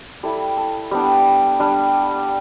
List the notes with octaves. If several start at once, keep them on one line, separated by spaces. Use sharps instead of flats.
G3 E4 A4
A4
G3 B3 D4 G4
G3 D4